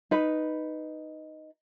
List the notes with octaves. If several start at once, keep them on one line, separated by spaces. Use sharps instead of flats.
D#4 B4